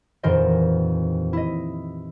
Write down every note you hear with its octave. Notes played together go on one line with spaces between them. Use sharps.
D#1 F2 E3 A#4 C5 D#5
E4 D#5